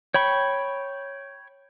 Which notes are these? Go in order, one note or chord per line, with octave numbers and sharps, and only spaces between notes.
C#5 G5 B5 C#6